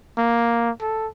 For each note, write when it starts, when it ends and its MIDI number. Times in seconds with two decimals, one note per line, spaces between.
0.18 0.70 58
0.81 1.07 69